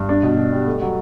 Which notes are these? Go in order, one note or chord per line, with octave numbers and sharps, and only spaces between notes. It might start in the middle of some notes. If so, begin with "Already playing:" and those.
Already playing: G2
D4
B2
B2
G3
A3
F#3